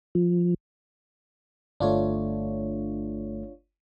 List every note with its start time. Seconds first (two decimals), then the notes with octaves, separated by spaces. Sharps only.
0.15 F3
1.80 G1 A3 D4 F4 C#5